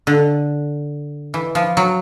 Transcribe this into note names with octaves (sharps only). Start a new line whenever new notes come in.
D3
E3
F3
F#3